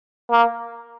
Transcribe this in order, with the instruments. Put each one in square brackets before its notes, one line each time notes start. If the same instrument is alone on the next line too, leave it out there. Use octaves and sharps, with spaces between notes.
[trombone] A#3